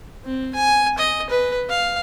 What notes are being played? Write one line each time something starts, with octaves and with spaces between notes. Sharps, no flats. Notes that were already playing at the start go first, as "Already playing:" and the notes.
C4
G#5
D#5
B4
F5